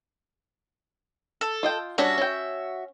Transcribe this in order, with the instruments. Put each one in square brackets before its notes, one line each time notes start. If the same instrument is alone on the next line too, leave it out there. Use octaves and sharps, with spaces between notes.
[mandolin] A4
[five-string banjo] F4 D#5 G5
[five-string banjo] G3 C#4 D4 [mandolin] F#4 E5
[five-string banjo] C#4 G5